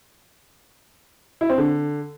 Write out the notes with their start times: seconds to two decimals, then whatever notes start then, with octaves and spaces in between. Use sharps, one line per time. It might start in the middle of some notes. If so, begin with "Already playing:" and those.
1.41 E4
1.49 C4
1.58 D3